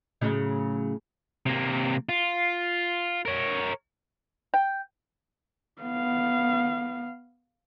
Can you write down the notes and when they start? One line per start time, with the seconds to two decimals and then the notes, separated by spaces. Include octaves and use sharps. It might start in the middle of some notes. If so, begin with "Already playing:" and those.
0.21 A2 C#3 F#3
1.46 C3 A#3
2.09 F4
3.25 A#4 C#5
4.54 G5
5.82 B3 F5